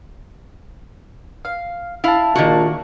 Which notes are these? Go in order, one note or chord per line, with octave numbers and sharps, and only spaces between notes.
F5
E4 E5 F5 A5
A#1 A#2 D#3 A#3 F#4